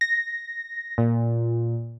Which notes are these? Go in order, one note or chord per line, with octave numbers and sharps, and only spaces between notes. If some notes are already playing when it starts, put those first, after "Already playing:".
A#6
A#2